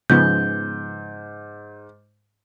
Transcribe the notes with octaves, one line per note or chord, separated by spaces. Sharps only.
G#2 C#3 F3 B3 G6